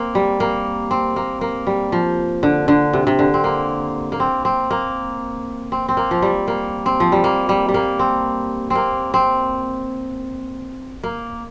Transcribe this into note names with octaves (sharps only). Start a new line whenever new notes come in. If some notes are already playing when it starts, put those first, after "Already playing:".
Already playing: A#3 C4
G3
A#3
C4
A#3
A#3
G3
F3
D3
D3
C3
C3
D3
C4
A#3
A#3
C4
C4
A#3
C4
C4
A#3
F3
G3
A#3
C4
F3
G3
A#3
G3
G3
A#3
C4
A#3 C4
C4
A#3